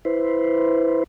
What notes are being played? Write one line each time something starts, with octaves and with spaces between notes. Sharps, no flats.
E4 B4 C5